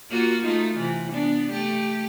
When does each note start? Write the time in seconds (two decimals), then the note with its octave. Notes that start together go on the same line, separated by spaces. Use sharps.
0.10 A#3 F4 F#4
0.44 A3 D#4 F4
0.78 C3 E3
1.13 B3 D4
1.53 A3 G4